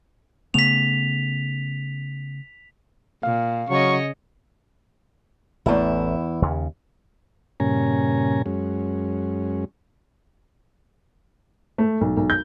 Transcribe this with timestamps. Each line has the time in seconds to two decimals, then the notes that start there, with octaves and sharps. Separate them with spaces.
0.54 C#3 A3 B3 B6 F7
3.23 A#2 F5
3.70 C#3 F#3 C#5 D#5 C#6
5.66 A1 E2 A3 E4
6.42 D#2 C#3
7.60 G2 A#2 C#3 C#4 G#5 A#5
8.46 F#2 G#3 C#4
11.78 A3
12.01 B1
12.17 B1
12.30 G6